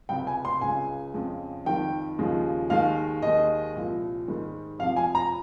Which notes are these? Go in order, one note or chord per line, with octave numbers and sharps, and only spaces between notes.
C#2 C3 G3 G5
G#5
C6
C#2 C#3 G#3 G#5
F2 C#3 G#3
F2 D#3 G3 G5
D#2 C#3 F3 G#3
D#2 D#3 G#3 F5
D#2 D#3 G#3 D#5
C2 A#2 F3
G#2 D#3 G3
F2 C3 F3 F5
G#5
A#5